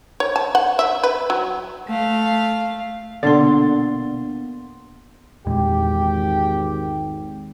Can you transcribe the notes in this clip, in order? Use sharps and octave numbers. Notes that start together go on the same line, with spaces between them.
C#5
A5
F#5
E5
B4
F#3
A3 F5
B2 D3 A#3 B3 D4 C6 A6
G#1 E2 A#2 G#3 G4